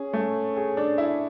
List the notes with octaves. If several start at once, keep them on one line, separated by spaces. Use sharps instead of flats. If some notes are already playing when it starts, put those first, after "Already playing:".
Already playing: C#4 G#4
A3 A4
G#4
D4 D5
E4 E5